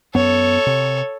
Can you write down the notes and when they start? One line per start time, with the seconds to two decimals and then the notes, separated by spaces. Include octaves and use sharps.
0.15 F#2 B3 A4 C#5
0.67 C3